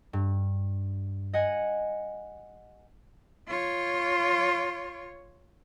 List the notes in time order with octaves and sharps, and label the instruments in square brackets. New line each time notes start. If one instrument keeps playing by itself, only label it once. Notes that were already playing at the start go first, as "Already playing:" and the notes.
[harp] G2
D#5 F#5 G#5
[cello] F4 C#5